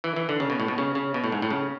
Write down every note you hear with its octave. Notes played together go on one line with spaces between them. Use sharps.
E3
E3
D3
C#3
B2
A2
B2
C#3
C#3
B2
A2
G#2
A2
C#3